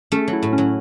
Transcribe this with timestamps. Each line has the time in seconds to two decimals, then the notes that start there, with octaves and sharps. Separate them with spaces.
0.12 A3 C#4
0.28 F#3
0.33 E4
0.43 A2
0.53 C#4
0.58 F#3